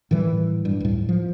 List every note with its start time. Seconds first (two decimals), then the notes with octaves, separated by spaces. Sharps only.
0.11 A2 D#3 E3 G3
0.65 G2
0.80 D1 A2
1.09 F3